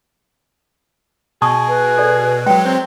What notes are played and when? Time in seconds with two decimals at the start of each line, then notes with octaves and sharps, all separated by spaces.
1.42 B2 G#4 A5 C#6 D#6
1.68 B4
1.98 A4 D5
2.46 F#3 G#3 G5
2.66 C4